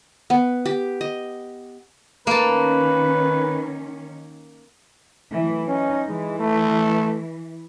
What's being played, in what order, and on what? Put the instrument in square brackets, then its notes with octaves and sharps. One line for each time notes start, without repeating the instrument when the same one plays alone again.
[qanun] B3
G4
D#5
[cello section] D#3 C#4 [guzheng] A#3 A5 [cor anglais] B4
[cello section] E3 F#3 A3
[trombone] C#4 [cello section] D#4
[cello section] E3 [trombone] G#3
[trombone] A3